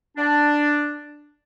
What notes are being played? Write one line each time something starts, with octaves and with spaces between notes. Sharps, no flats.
D4